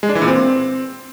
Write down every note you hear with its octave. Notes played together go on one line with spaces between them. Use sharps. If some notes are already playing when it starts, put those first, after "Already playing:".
G#3
D4
E3
A#2
C4